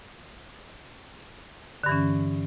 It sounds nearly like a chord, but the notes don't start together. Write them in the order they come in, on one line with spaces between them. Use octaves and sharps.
D3 G2 E3 C#4